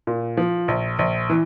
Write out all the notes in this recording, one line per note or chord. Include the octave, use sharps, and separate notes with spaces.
A#2
F3
A#1
A#1
E3